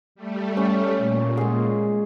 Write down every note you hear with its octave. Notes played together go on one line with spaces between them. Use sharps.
G3 A3
C#4
A#2
G#3 G#4